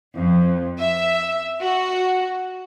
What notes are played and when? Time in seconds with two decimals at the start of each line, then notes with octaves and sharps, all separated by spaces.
0.15 F2
0.79 E5
1.61 F#4